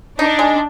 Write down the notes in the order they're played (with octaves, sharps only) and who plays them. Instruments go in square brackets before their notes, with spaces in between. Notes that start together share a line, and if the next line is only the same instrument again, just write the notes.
[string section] D4 [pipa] D#4
[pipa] G#3